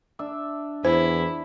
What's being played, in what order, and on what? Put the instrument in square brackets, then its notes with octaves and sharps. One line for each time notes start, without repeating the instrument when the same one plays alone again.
[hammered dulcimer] D4 E5
[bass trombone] E2 [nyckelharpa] E4 [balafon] C5